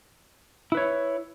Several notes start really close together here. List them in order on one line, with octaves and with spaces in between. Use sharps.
E4 B4 C#5